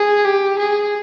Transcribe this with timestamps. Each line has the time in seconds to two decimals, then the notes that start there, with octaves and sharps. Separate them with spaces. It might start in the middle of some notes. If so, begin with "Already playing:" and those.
Already playing: G#4
0.25 G4
0.59 G#4